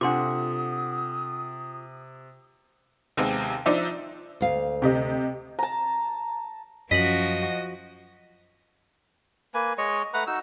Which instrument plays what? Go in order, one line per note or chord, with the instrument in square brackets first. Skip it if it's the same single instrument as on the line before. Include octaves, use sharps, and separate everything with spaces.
[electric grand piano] C3 [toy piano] D4 C6 D6 [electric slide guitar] F4 A4 F#5 [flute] D#6
[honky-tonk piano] D#2 C3 G#3 B3 C4 D#4
F3 D4 D#4 C5 D5 E5
[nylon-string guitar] D2 F5
[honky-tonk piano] C3 G4 D#5
[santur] A5 A#5
[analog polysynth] F#2 [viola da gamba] F3 F#4 [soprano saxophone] D#5 [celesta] B6 F#7
[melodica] A#3 B4 G#5
G#3 C#5 D#5 C#6
A3 B4 F#5 A#5
D#4 F#4 E6